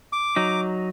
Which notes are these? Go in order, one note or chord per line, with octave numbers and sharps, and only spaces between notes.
D6
F#3 D#4